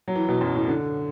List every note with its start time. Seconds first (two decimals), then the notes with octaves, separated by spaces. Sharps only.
0.08 F#3
0.15 E3
0.29 B2
0.41 F#2
0.54 A2
0.68 D3